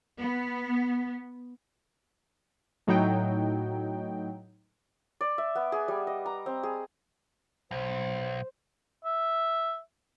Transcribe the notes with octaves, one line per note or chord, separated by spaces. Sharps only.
B3
A2 F#3 D#4 G5
D5
E5
B3
G#4
G3
D#5
A#5
C4
G#4
B1 C5
E5